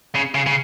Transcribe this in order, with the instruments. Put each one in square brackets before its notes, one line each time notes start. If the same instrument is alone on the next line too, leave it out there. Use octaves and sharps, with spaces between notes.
[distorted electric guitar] C#3
C#3
C#3